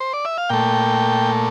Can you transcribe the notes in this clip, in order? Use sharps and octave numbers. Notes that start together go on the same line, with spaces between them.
C5
D5
E5
F5
A#2 A3 G5